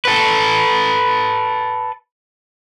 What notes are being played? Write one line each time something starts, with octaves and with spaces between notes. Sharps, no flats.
A4 B4